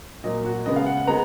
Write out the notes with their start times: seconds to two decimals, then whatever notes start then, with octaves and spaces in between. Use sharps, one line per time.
0.24 A#2 F#3 A#3 D#5
0.45 F#4
0.66 C#3 G#3 B3 D#5
0.76 F5
0.86 F#5
0.97 F#5
1.07 G#3 B3 A#5